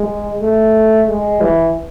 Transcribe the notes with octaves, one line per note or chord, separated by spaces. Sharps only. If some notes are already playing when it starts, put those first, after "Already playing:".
Already playing: G#3
A3
G#3
E3